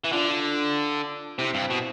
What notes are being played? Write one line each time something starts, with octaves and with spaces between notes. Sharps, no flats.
E3
D3 D4 F4
C3 C4 E4
G2
B2